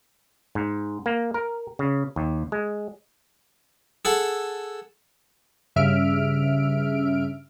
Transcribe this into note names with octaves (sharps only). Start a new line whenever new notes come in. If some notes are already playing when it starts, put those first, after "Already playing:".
G#2
A#3
A#4
C#3
D#2
G#3
G#4 A4 F#5
G2 C#3 E5 F6 D7